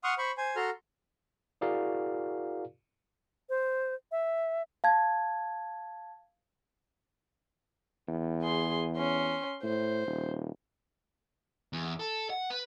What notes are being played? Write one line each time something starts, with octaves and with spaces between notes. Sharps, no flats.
F#5 C6 C#6 D#6 F6
C5 B5 C#6
C5 G#5
F#4 A4 A#5 C6 F6
E4 F#4 G#4 A#4 D5 F5
C5
E5
F5 A5 G#6
E2
G#4 C6
C#4 C6
A2 C5
D#1
E2
A4
F#5
B4